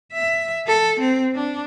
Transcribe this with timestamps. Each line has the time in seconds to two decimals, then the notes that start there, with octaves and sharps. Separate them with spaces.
0.13 E5
0.67 A4
1.00 C4
1.35 D4